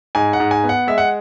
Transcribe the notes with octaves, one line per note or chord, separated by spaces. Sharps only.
G#2 G#5
F#5
G#2
G#5
B3
F#5
G#3 E5
F#5